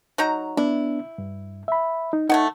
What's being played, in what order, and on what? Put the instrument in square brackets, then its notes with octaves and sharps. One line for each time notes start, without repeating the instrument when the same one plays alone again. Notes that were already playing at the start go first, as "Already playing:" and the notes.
[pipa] F#3 D#4 A#5
[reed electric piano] B3 D4 [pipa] E4
[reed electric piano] G2
E5 B5
D#4
[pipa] A3 C#5 F#5 [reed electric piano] D#4